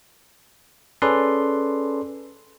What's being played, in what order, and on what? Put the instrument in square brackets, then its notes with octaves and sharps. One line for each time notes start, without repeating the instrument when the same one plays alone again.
[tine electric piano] C#4 G#4 A4 B4 D5 C6